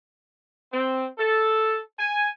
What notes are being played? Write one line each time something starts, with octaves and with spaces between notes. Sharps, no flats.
C4
A4
G#5